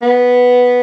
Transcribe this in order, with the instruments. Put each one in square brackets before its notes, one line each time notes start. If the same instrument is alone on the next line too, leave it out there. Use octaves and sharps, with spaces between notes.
[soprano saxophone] B3